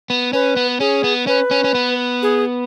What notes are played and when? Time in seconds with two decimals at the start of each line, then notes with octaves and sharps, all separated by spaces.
0.10 B3
0.33 C#4 B4
0.56 B3
0.80 C#4 G#4
1.04 B3
1.27 C#4 B4
1.51 C#4
1.64 C#4
1.74 B3
2.22 G#4